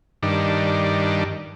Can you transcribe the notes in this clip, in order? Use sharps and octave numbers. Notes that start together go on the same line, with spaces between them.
G2 D#3 D4